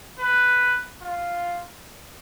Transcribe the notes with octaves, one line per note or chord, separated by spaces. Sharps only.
B4
F4